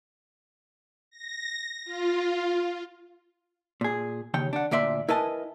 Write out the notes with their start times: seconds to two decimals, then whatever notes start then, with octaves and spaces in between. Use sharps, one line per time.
1.10 A#6
1.85 F4
3.81 A#2 G#4
4.34 D#2 C#3 C#5 G5
4.53 D4 F#5
4.71 D2 A#2 D5 E5 C6
5.09 E4 A#4 B4 D#5 G#5 A5